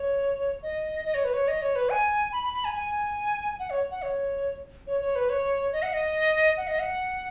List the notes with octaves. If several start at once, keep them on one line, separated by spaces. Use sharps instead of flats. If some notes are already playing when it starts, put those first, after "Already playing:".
Already playing: C#5
D#5
D#5
C#5
B4
C#5
D#5
C#5
B4
G#5
B5
B5
B5
G#5
G#5
F#5
C#5
F#5
C#5
C#5
C#5
B4
C#5
D#5
F#5
D#5
F#5
D#5
F#5